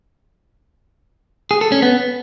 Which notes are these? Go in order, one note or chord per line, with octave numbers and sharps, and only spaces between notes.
G#4
A4
C#4
B3